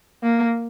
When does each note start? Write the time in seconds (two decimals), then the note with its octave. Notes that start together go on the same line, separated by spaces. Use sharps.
0.23 A#3